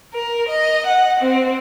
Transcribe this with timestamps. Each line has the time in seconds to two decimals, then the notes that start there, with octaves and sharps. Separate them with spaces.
0.13 A#4
0.49 D#5
0.87 F#5
1.21 C4